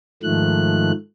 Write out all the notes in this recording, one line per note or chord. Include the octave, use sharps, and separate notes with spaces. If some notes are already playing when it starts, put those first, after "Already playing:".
G#2 D#3 F3 A3 F#6